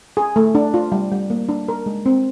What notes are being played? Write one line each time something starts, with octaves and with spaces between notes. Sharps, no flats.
G#4
A3
D4
F4
G3
G3
A#3
D4
A#4
G#3
C4